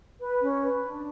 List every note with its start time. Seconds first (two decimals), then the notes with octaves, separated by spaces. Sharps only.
0.20 B4
0.41 C#4
0.62 B4
0.82 D4